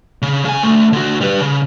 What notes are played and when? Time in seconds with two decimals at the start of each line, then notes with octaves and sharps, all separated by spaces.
0.22 C#3
0.45 C#3 G#5
0.63 D2 A3
0.93 D3 F#4
1.21 G3 B4
1.40 C#3